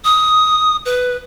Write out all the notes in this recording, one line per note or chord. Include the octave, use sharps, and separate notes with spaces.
D#6
B4